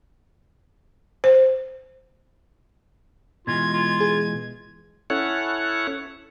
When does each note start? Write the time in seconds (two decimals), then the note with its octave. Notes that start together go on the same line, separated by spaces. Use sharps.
1.24 C5
3.47 B2 E3 G#3 F4 G#6
3.74 F4
4.00 G#4
5.10 C#4 E4 A4 C#5 F#5